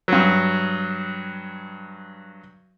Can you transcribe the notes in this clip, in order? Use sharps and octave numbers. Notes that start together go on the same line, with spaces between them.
G2 F#3